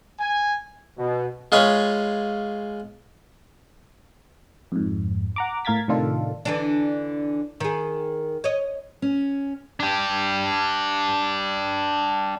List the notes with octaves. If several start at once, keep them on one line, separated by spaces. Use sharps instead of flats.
G#5
B2
G#3 F4 G#4 B4 C#5
F2 G#2
F#5 A#5 D6
A2 A#4 F5 G#6 A6 B6
A2 C3 D#3 D4 F4 A4
D3 E3 D4
D#3 G#4
C#5 D#5
C#4
D4 G4